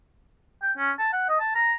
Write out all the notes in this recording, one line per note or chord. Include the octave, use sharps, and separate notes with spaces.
G5
C#4
A5
F#5
D#5
A5
A#5